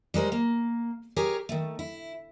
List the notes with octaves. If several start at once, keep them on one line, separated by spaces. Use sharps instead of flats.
G3 G#3 A#4 C5
A#3
G4 G#4 A#4 C#5 G#5
D#3 A3
E4